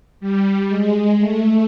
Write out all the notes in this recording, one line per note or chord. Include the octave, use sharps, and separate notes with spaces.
G3
G#3
A3